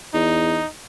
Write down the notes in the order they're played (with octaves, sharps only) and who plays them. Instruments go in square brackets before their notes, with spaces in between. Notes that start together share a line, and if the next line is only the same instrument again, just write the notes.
[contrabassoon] E2 [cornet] D#4